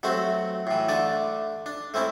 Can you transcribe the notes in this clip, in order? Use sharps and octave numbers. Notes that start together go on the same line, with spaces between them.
F#3 A3 C4 F#4
A2 E3
D3 A3 D4 D5
D4
A3 C4 C#4 E4